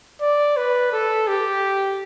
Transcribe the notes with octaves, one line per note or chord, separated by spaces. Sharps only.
D5
B4
A4
G4